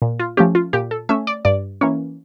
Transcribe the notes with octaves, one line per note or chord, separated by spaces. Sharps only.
A#2
F4
F3 A3 C#4 G4
F4
A#2 G4
A4
A3 C#4 E5
D5
G2 D5
E3 A#3 C#4 C#5